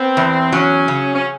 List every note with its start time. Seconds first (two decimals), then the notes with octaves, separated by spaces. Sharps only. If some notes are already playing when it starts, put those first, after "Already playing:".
Already playing: B3 C4
0.17 E2
0.52 F#3 C#4
0.88 C#3
1.15 C#4